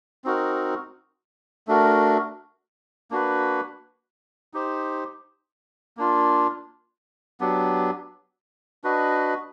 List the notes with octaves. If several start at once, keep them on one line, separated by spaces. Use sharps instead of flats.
C4 D#4 F#4 A#4
A3 D4 F#4 A#4
A#3 D4 F#4 B4
D#4 G4 C5
A#3 D4 F4
F#3 B3 D4 G4
D4 F#4 B4 D#5